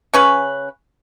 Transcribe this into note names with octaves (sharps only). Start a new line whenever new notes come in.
C#3 C#4 B4